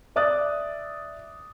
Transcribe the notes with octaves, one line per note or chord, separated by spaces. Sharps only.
D5 E5 D6 D#6 F#6 A6